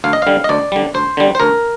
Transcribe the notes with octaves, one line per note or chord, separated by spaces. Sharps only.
D2 F5
D#5
D3 G3 F5
D#5
D2 D5
D3 G3
D2 C5
D3 G3
C5
D2 A#4